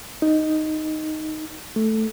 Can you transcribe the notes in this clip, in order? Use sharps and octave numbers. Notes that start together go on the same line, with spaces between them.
D#4
A3